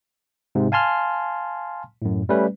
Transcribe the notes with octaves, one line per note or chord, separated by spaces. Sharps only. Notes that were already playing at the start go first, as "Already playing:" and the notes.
G#2 C3
F5 G#5 A5 C6 F6
F#2 A2
G3 A3 C#4 B4